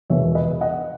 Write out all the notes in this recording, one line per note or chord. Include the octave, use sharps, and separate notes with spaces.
E1 E2 B2 C#5 E5
B4 D#5
D#5 F#5